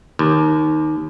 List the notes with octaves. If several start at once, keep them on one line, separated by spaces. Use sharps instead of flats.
D#2